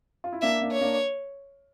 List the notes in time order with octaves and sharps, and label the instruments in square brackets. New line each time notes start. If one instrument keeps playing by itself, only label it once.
[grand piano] F4
E4
[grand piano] A#3 D4 [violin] E5
[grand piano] A#3 D4
[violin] C#5
[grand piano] A#3 D4